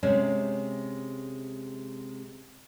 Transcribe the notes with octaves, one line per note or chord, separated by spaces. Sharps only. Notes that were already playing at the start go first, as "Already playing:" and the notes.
C3 G#3 C#4